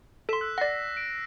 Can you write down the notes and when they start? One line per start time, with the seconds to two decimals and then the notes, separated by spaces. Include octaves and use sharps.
0.29 A4 C6 B6 E7
0.41 E6 F#6
0.58 D5 F#5 A#6 C7
0.97 D7